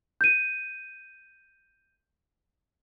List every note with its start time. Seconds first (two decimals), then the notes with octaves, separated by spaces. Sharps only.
0.21 G6 D#7